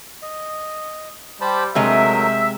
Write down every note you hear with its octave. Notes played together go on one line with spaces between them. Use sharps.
D#5
G3 G4 C5 A5 B5
C3 F#3 G#3 A3 A#4 D#5 E5